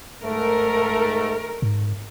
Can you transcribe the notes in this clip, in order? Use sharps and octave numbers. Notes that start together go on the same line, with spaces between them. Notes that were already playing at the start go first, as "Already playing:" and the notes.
G#2 A3 A#4
G#2